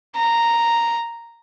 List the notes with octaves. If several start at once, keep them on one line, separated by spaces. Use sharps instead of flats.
A#5